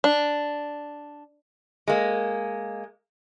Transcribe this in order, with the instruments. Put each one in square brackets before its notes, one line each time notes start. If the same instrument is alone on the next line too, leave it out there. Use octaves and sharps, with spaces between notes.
[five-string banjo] D4
[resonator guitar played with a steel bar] G#3 A#3